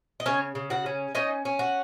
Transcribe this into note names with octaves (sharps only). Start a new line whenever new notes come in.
D#5
C#3 C#4 C#5
C#3
F#4 F#5
C#4
C#4 D#4 D#5
C#4
F#4